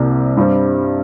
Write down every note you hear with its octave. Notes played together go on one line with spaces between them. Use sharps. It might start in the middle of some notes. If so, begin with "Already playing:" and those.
Already playing: C2 C3 A#3
G2 G3 C4